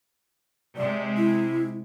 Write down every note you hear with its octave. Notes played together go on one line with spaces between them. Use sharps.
C3 G#3 D5
E4